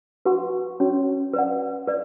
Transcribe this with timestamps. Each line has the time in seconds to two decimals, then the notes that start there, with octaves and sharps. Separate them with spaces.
0.26 F#4 B4 F#5 C#6
0.80 C#4 F#4 C#5
1.34 B4 D5 F#5
1.87 B4 D5